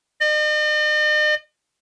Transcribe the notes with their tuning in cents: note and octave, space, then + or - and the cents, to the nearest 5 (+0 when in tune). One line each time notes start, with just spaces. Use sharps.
D#5 -45